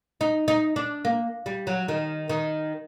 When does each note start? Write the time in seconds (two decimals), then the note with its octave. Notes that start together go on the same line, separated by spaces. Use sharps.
0.21 D#4
0.48 D#4
0.76 D4
1.05 A#3
1.46 G3
1.67 F#3
1.88 D#3
2.30 D#3